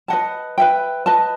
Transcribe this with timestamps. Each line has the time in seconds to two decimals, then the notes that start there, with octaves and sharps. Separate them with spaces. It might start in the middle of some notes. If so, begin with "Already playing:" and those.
0.08 B4 D#5 F#5 A5
0.58 B4 E5 G5
1.06 B4 D#5 A5